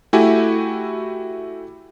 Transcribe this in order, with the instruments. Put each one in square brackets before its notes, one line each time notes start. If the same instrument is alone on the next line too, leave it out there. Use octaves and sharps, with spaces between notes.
[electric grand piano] A3 E4 F#4 G4 G#5